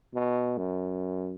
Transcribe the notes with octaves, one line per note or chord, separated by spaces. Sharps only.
B2
F#2